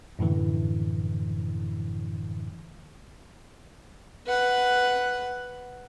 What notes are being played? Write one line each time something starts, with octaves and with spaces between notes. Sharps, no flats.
F#2 A2 D3 E3
B4 F#5